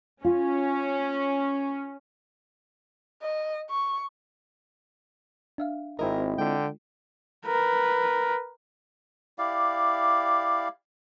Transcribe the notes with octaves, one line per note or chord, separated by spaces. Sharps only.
C#4 F4
D#5
C#6
D4 E5 F5
G#1 C4 E4 A#4 D#5
D3 G#3 F4 G5
A#4 B4
E4 G4 D5 F5